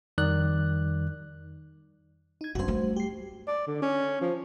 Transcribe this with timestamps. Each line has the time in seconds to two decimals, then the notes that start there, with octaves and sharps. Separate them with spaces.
0.18 F2 D#3 G3 D5 F#6
2.41 D#4 G#6
2.55 G2 C#4 F#4 C5
2.68 G3 A3
2.96 G4 C7
3.48 D5
3.67 D3
3.82 C#4
4.21 F3